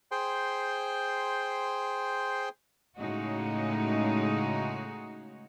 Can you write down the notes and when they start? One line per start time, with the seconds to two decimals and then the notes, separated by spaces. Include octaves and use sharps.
0.11 G#4 C5 G5 C6
2.98 A2 C#3 G#3 D#4 F#4 C#5